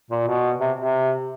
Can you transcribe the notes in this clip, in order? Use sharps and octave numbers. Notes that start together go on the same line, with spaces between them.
A#2
B2
C3
C3